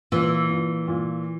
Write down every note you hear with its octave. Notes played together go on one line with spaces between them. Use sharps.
A#2 E3
A#2
A#2